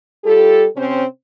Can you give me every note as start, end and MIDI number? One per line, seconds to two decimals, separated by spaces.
0.25 0.66 55
0.25 0.66 65
0.25 0.66 67
0.25 0.66 69
0.76 1.04 48
0.76 1.04 60
0.76 1.04 61
0.76 1.04 72